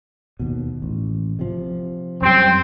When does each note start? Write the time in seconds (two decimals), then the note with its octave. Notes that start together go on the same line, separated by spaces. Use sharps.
0.39 D#2 B2
0.82 A1
1.39 C3 F3
2.22 F#2 G3 C4 G5